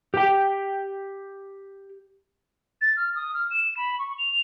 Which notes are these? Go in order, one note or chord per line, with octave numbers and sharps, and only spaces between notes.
G4 G5
A6
F6
D#6
F6
E7
B5
C#6
F7